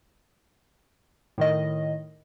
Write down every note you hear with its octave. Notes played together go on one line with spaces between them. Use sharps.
A2 D#3 D#5